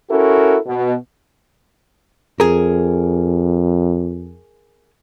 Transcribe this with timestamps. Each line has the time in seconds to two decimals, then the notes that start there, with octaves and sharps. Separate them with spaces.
0.11 C#4 E4 F#4 A4 A#4
0.67 B2
2.40 F2 G#4 A#4